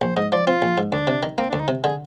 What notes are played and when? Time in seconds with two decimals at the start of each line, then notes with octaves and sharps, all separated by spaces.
0.01 A#1 C5
0.16 G#2 D#5
0.32 F3 D5
0.47 C4 F4
0.62 A#1
0.78 G#2
0.92 D2 D4
1.07 C3
1.23 D#3
1.38 A#3 C4
1.50 D4
1.53 D2
1.60 D#4
1.68 C3
1.83 D3 G#4